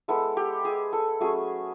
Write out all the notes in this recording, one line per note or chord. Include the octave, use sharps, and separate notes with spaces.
G#3 B3 E4 A4
G4
G#4
A4
F#3 A3 C#4 G#4